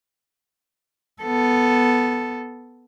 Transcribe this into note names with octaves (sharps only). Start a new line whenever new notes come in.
B3 A4